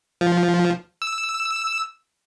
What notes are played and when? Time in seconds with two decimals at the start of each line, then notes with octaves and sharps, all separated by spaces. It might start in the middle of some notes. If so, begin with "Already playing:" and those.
0.21 F3
1.02 E6